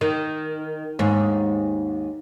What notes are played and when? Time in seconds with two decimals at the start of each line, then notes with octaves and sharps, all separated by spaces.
0.01 D#3
0.99 D#2 G#2